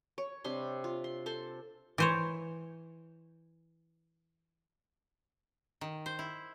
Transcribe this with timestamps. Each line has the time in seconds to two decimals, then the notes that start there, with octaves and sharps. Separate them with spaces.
0.18 C#5
0.44 C3 G3 D4 C6
0.84 F4
1.04 C6
1.26 A4 C5 C6
1.98 E3 C5 C#5
5.81 D#3
6.06 C5
6.19 E4